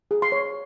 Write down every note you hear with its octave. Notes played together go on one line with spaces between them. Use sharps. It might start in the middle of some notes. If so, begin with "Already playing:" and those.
G#4
C6
C#5